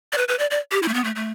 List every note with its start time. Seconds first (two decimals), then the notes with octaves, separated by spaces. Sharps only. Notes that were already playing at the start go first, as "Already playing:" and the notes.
0.13 D5
0.18 B4
0.28 B4
0.39 D5
0.51 D5
0.72 G4
0.83 E4
0.88 A3
0.94 B3
1.04 A3
1.16 A3